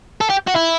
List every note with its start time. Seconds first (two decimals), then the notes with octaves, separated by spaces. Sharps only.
0.21 A4
0.30 G4
0.48 F#4
0.56 E4